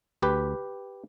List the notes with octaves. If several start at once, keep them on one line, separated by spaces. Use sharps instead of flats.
D2 G4 B4